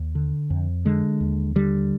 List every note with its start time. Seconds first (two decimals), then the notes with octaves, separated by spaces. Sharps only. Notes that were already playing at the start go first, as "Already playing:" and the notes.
Already playing: D#2
0.15 D3
0.50 F2
0.85 D3 G#3
1.20 D#2
1.56 D3 G3